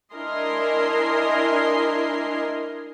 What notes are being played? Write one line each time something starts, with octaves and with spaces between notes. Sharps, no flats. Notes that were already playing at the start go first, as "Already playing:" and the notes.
D4 E4 A#4 D#5 G#5 C6